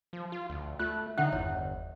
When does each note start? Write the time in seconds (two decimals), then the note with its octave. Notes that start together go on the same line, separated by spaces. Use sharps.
0.13 F3
0.32 F4
0.50 D2
0.79 A3 F4 F#6
1.18 D3 D#4 E5 F#5 G5 F#6
1.33 G1 E2 E4 C#5